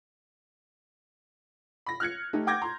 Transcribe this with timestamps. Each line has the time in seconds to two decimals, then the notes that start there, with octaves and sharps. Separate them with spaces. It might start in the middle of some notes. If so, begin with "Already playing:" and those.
1.86 B5 A#6
2.00 F6 F#6 G#6 C#7
2.33 A3 D#4 G4
2.47 F#5 G5 D6 G6 G#6 A#6
2.62 A#5 C6